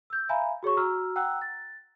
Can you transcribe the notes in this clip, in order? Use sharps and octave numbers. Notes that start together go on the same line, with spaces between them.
E6 G6
E5 F5 G#5 A#5 B5
F#4 G#4 C#5 C#6
F#4 A#5 E6 F6
F#5 G5 A#5 E6 F#6
A6